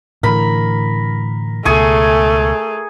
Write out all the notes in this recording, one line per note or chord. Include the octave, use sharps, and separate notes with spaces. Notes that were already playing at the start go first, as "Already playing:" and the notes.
A2 D3 E3 A#4 B5
C#2 B2 A3 G#4 G#5 C#6